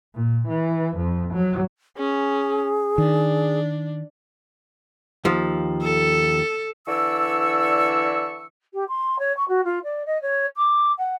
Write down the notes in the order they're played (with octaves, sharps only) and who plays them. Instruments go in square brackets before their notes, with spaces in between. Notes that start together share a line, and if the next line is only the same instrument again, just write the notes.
[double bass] A#2
E3
F2
F#3
[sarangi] C#4 [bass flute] G#4
[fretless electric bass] D#3 [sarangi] D4
[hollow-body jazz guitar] D#2 F3
[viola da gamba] A4
[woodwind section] D3 E3 D5 C#6 E6
[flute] G4
C6
C#5
C#6
F#4
F4
D5
D#5
C#5
D6
F#5